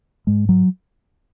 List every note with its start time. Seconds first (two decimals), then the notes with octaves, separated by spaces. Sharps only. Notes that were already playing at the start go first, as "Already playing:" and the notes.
0.27 G#2 G#3
0.49 F#3